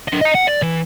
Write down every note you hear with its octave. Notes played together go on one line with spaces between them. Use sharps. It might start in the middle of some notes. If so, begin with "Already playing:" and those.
D3 D#5
D#5 A#5
F#5
D5
E3